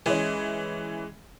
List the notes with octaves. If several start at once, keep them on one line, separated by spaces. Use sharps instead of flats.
E3 G#3 C#4